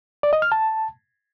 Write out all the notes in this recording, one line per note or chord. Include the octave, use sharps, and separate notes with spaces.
D5
D#5
F6
A5